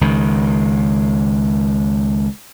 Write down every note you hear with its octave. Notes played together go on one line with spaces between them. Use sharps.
C#2 D#3